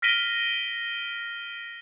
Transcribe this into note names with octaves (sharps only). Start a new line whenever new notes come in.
F6 A#6 B6 D7 D#7 G7